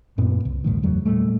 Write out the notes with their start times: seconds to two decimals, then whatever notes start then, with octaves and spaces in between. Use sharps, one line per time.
0.18 F#2 A#2 B3 C4
0.45 C2
0.64 A#1 D#2 G#2 D#3
0.83 F#1 E2 F#3 A3
1.05 A#2 G3 A3